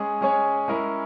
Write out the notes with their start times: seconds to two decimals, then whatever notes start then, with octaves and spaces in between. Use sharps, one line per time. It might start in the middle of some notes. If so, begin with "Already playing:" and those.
Already playing: G#3 C#4 G#4 C#5
0.21 G#3 C#4 G#4 C#5
0.68 G#3 C#4 E4 A#4